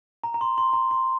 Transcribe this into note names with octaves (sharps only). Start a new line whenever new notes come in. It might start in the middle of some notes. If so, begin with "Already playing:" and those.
A#5
A#5
C6
C6
A#5
C6